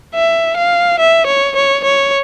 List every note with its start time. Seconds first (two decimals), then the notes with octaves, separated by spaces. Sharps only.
0.15 E5
0.57 F5
0.99 E5
1.27 C#5
1.56 C#5
1.84 C#5